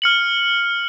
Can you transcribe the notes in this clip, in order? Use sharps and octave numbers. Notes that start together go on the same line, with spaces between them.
F6 C#7 F#7